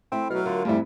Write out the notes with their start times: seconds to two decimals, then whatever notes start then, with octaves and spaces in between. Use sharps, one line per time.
0.12 A3 C4 E4
0.30 B2 F#3 F6
0.46 D3 F4 A#4
0.65 F2 G#2 G3 A3 E4